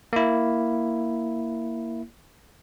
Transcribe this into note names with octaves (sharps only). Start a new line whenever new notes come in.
A#3 E4